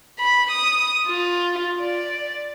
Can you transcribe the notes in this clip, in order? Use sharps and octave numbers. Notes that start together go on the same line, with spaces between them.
B5
D#6
F4
D5